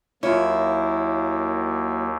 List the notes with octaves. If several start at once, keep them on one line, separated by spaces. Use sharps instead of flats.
D#2 F#3 A#3 E4 F4 C#5